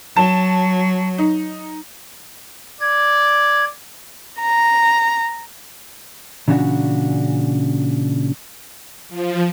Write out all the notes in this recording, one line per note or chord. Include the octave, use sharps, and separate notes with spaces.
F#3 A5
D#4
D5 G#6
A#5
A#2 C#3 E3 C#4 D4 F#4
F3